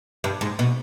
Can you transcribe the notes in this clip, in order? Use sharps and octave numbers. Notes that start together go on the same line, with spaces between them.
G2
G#2
B2